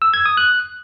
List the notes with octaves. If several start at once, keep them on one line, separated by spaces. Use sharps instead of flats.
E6
G#6
D#6
F#6